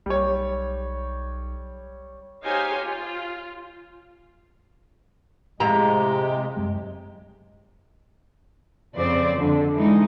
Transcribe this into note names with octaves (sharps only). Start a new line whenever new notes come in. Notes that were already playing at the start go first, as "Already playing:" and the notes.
B1 G3 C#5
D#4 G4 C5 C#5 F5 G#5
F4
F2 A2 C3 G#3 G4 A#5
F#2 G#3
F2 C#3 C4 C5 D5
F2 D3
E3 G#3 D#4